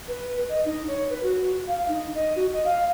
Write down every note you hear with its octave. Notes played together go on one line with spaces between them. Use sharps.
B4
D#5
D#4
C#5
B4
F#4
F5
D#4
D#5
F#4
D#5
F5